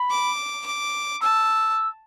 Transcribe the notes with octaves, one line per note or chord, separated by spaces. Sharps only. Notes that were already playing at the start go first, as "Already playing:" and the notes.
Already playing: B5
D6
D6
A5 E6